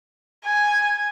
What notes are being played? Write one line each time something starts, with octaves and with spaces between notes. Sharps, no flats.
G#5